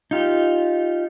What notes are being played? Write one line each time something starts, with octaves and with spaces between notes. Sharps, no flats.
D#4 F4 G4